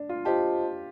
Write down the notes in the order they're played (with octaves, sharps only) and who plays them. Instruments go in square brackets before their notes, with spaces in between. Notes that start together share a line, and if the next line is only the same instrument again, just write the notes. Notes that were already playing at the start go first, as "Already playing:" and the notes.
Already playing: [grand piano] D4
F4
[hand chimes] F4 C5 D#5 A5 [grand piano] G4